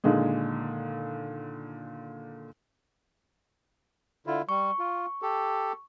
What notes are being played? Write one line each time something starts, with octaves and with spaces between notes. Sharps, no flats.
A#2 D3 D#3 G#3
D3 E4 F4
G3 C#6
F4
G4 A4